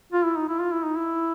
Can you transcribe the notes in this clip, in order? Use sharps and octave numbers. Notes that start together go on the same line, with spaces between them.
F4
E4
D#4
E4
F4
E4
D#4
E4